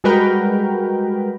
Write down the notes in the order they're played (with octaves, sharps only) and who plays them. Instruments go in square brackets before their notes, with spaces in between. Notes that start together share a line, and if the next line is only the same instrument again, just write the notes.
[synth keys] G3 G#3 F#4 A#4 B4 G5